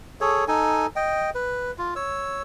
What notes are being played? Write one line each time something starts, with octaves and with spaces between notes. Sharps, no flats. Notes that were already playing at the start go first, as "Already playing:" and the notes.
G#4 A4 C#5
D#4 A4 G#5
D#5 G5
B4
F4
C#5 E6